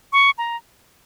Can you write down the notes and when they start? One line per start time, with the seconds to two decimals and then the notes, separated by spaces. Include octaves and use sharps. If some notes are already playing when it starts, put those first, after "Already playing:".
0.13 C#6
0.38 A#5